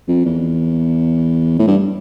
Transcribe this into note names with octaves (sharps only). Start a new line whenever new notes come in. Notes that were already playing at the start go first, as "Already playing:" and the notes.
F2
E2
A2
G2